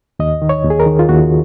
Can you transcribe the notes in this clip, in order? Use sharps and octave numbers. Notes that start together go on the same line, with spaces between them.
D#2 D#5
D#3
C#5
D#2
G#4
A#4
D#3
F4
D#2 F#4